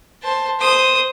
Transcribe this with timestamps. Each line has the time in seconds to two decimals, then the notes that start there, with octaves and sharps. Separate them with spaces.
0.22 C5 A5
0.60 C5 D#6